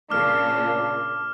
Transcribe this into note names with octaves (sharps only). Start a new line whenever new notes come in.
A#2 C#3 A#3 D4 D6 F6